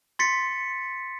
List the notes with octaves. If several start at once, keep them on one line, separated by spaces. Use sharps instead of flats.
C6 A6 B6 C#7